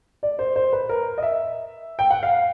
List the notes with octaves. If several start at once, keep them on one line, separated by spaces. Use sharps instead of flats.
D5
C5
C5
B4
A#4
D#5
E5
G5
F#5
F5